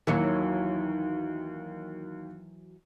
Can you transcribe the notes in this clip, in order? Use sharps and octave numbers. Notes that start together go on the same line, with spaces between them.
D#2 D#3 E3 F#3 C#5